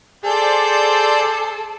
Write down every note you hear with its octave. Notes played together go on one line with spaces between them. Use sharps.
G#4 A4 C5 D5 G6